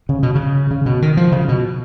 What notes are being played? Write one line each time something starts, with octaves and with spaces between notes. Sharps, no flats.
C#3
B2
C#3
C#3
B2
D#3
F3
C#3
B2